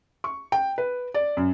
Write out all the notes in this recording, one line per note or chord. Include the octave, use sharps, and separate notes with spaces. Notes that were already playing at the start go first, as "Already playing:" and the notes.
C#6
G5
B4
D5
F#2